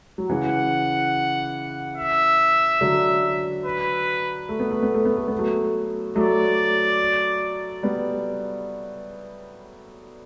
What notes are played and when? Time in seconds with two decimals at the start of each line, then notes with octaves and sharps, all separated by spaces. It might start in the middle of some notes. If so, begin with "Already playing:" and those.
0.18 F#3
0.29 C#3 E3 F#5
1.97 E5
2.81 D3 F#3
3.65 B4
4.49 A3
4.60 B3
4.71 A3
4.83 B3
4.94 A3
5.05 B3
5.16 A3
5.28 B3
5.39 F#3 A3
6.16 F#3 A3 D5
7.83 G3 B3